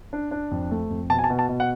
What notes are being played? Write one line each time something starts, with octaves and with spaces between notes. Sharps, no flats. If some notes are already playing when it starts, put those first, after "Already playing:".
D4
D4
F2
A3
F2
B2 A5
G#5
A5
B2
A5
B2
F#5